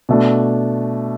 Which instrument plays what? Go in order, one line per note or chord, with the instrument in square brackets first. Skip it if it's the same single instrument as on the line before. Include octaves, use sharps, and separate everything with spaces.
[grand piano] B2 A3 D4